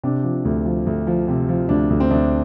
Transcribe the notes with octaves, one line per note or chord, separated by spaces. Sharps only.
C3 D4
F3
D2
F3
D2
F3
C3
F3
D2 D4
D2
C4
D2 D4